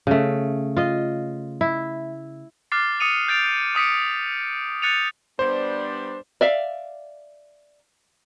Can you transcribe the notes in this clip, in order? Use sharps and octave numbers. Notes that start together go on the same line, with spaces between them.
C#3 A3
F4 D#5
E4
D6 F6 F#6 A6 C7
D#6 C#7 D#7 F7
G6 A6 D7 F7
D6 D#6 B6 C#7 D7
F#6 G6 A6 C#7 D#7 F7
G3 B3 D4 C5
D5 E5 F5